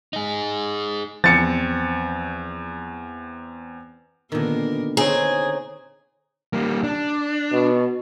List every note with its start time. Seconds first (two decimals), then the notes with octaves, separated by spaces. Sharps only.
0.13 D#4 G#4
1.24 E2 F3 C4 A6 C#7
4.32 A#2 D3 D#3 B3 A#4
4.97 D3 B3 C4 D#4 G#4 C#5 A#5
6.53 G3 A#3
6.84 D4
7.52 B2